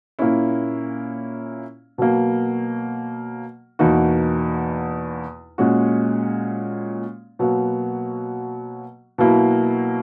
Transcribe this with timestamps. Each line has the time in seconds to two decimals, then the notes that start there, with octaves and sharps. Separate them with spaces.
0.19 A#2 A#3 C#4 E4
1.98 B2 F#3 A#3
3.79 E2 B2 A#3 D#4 F#4
5.58 A#2 G#3 C#4 F#4
7.39 B2 F#3 A#3
9.18 B2 F#3 A#3 E4